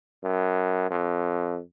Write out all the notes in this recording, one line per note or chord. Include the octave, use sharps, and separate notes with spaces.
F#2
F2